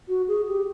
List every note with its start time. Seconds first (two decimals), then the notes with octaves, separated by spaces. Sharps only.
0.08 F#4
0.28 G#4
0.48 G4